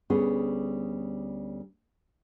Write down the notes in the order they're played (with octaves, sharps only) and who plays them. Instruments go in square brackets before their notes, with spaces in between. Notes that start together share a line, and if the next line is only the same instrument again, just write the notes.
[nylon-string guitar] D2 G3 B3 C#4 G#4